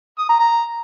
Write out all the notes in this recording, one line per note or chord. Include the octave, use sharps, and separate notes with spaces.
D#6
A#5
A#5